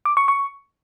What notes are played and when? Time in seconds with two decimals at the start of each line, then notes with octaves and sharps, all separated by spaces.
0.05 D6
0.17 C#6
0.28 C#6